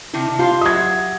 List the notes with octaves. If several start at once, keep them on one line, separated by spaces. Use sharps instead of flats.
C3 D#3 D4 E4
F4 G4 C5 F5
F#3 E5 D#6 G#6